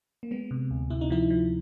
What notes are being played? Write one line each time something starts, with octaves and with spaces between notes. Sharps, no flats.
A#3
G#3 B3
C3
D2
C3 E4
D#4
F3 E4
F3